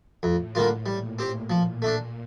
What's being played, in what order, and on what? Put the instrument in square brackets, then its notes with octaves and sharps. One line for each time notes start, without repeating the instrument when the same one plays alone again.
[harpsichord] F2 [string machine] A2
[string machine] A2 [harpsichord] D3 G3 A#3 F4
[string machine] A#2 [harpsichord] G3
[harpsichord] C4 G4
[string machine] A#2 [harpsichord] F3
[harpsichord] A3 D4